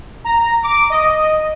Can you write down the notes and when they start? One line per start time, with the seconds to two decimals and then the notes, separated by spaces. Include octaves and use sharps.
0.24 A#5
0.63 D6
0.90 D#5